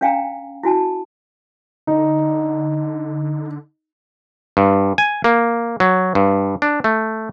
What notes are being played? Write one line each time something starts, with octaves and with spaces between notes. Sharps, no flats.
C#4 D4 F5 G5 G#5 A#5
E4 F#4 G#5 A5
D3 D#4
G2
G#5
A#3
F#3
G2
D4
A3